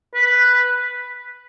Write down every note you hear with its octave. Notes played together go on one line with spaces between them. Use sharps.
B4